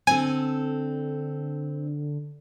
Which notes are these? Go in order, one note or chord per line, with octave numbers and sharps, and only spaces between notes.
D3 C4 A4 G#5